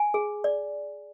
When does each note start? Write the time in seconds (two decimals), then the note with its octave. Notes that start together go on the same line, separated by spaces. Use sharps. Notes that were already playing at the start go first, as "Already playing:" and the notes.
Already playing: G#5
0.14 G#4
0.44 D5